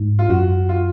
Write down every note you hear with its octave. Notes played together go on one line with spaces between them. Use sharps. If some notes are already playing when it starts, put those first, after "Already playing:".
Already playing: G#2
F4
F#2 F#4
F4